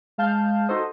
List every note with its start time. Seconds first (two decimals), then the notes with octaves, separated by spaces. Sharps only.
0.18 G#3 F5 A5 F6 G6
0.68 D#4 F#4 A4 C5 D#5